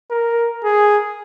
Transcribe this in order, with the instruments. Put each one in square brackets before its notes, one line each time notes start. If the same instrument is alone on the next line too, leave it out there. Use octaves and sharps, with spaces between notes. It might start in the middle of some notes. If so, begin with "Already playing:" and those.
[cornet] A#4
G#4